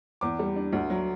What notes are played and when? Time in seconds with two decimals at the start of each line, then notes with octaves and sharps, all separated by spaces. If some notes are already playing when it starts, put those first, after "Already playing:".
0.21 E2 D6
0.39 G3
0.56 D4
0.73 D2
0.90 F#3